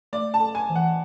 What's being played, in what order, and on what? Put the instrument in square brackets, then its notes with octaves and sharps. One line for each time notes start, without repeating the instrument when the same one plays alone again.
[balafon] A3 [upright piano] D5
[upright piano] A5
[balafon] A4
[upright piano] G#5
[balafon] E3
[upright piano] F#5